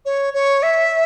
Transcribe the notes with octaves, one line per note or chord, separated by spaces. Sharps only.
C#5
C#5
E5